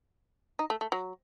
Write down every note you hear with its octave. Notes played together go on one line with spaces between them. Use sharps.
D#4
A3
A3
F#3